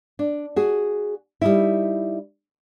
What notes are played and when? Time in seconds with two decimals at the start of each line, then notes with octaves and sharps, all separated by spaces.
0.19 D4
0.56 F#4 G#4
1.42 G3 D#4 E4